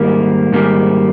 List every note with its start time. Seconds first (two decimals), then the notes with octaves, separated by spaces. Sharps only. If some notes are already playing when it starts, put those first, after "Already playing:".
Already playing: G#2 D#3 G3 A#3
0.52 G#2 D#3 G3 A#3